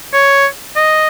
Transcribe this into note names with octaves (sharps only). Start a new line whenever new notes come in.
C#5
D#5